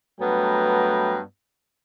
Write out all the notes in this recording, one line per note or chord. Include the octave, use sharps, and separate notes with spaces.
G2 F#3 A3 B3 G5 A#5